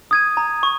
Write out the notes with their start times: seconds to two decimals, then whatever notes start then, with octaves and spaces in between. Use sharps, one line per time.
0.11 D#6 G#6 D#7
0.37 A#5
0.63 C#6